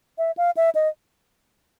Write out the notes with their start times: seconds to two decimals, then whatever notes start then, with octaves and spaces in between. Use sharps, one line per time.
0.18 E5
0.37 F5
0.57 E5
0.75 D#5